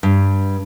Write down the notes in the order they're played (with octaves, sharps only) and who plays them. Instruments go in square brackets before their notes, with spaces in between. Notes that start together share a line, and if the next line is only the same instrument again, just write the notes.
[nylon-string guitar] G2